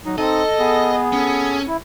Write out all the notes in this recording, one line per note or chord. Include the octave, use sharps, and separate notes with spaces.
F#3 D#4
C4 D#4 A4 D#5
B3 G#4
C#4 A4
E4